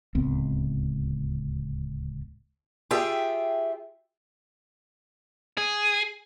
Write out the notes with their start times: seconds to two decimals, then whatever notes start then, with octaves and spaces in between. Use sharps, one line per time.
0.15 D1 C#2 B3 C4
2.91 F4 G4 G#4 E5 G5
5.57 G#4